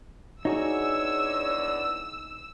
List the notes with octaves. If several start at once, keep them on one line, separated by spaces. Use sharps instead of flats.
E2 D4 D#4 F#4 G#4 C#5 D5 E6